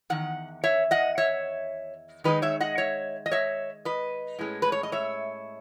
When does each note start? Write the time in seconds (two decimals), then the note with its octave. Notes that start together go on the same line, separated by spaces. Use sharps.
0.10 E2 D#3 F#5
0.64 C#5 E5
0.91 D#5 F#5
1.18 C#5 E5
2.24 D#3 G#3 D#4 B4 D#5
2.42 C#5 E5
2.61 D#5 F#5
2.78 C#5 E5
3.26 D#5
3.32 C#5 E5
3.85 B4 D#5
4.39 A2 G#3 C#4
4.62 B4
4.72 C#5
4.83 D#5
4.92 C#5 E5